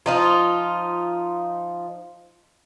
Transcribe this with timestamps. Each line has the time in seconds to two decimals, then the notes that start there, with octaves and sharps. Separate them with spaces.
0.06 F3 D#4 F4